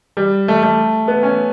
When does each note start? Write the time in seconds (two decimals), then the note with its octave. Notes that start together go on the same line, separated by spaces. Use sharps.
0.17 G3
0.48 A3
0.63 A3
1.08 B3
1.23 C#4